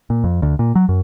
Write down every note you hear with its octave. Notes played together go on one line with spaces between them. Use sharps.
A#2
F2
D2
A#2
F#3
F#2